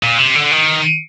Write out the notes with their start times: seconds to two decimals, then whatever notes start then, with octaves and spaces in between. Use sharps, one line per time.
0.03 A#2
0.18 C3
0.35 D3
0.52 D#3